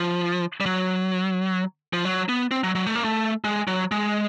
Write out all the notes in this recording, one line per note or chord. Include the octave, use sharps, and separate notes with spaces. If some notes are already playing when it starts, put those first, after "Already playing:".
Already playing: F3
G3
F#3
F3
F#3
B3
C4
F#3
F#3
A3
A#3
A3
G#3
F#3
G#3